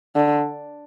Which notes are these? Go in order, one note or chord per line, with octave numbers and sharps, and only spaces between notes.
D3